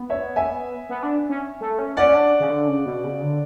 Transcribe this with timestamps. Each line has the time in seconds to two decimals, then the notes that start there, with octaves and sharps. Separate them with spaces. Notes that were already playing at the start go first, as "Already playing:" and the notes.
Already playing: B3
0.10 C#5 E5
0.36 E5 G#5
0.89 B3
1.03 D4
1.29 C#4
1.61 A3
1.79 C#4
1.97 C#4 D5 F#5
2.15 D4
2.40 C#3
2.50 D3
2.68 C#3
2.86 B2
3.04 C#3
3.22 D3